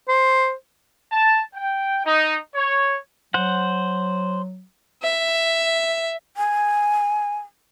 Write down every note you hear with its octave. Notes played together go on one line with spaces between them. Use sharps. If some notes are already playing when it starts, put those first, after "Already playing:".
C5
A5
G5
D#4
C#5
F#3 C5 F#5
E5
G#5